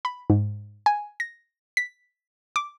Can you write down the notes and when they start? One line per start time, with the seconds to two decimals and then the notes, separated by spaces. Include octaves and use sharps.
0.05 B5
0.30 G#2
0.86 G#5
1.20 A#6
1.77 B6
2.56 D6